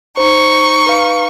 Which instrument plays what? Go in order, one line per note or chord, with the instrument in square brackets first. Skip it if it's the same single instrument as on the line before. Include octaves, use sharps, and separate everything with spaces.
[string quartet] D#4 C#6 [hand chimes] C5
[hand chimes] B4 F5